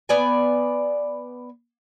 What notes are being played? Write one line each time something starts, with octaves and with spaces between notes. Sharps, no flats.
B3 D5 G#5